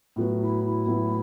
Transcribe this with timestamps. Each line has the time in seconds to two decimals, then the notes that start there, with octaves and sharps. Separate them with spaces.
0.16 A2 F#3 B3 F#4
0.41 E4
0.64 E4
0.87 A2 F#3 B3 F#4